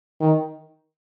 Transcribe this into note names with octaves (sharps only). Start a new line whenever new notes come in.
D#3